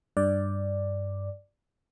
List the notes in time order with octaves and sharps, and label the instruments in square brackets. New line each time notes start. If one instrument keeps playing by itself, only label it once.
[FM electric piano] G2 D5